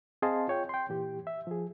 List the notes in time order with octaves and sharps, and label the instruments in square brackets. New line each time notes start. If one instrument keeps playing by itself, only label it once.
[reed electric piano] C4 G#4 D#5 F5 A5 C6
F4 C#5 G5
G5 C6
A#2 E3 G4
E5
F3 G#4